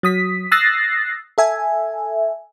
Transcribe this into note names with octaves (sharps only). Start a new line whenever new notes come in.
F#3 D#6 B6
D#6 E6 F#6 A6 A#6 C7
A4 E5 G#5